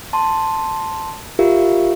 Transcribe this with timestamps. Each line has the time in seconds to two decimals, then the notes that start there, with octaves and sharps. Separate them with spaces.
0.13 A5 C6
1.39 F4 G4 A#4 E5 F5